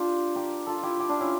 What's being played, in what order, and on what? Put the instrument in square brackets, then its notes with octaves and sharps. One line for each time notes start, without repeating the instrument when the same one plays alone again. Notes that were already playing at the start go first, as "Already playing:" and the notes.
Already playing: [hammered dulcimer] D4 F4 G4
G4 A#4
F4 A4
E4 G4
E4 G4
D4 F4
C#4 E4